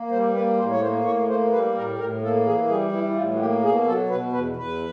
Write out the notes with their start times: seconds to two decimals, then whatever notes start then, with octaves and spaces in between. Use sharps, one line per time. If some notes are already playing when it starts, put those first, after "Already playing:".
Already playing: A#3
0.11 G3 C5
0.34 A#3 B4
0.57 A2 C5
0.70 C#5
0.81 A#3 C5
1.04 A2 C#5
1.28 A#3 C5
1.51 G3 B4
1.75 A2 A#4
1.98 A2 A#4
2.22 A#3 A4
2.45 E3 G#4
2.69 G3 G#4
2.92 E3 E4
3.15 A2 F4
3.34 F#4
3.39 A#3 G4
3.62 B2 G#4
3.86 F#3 A4
4.09 B2 B4
4.33 E2 B4
4.56 E2 B4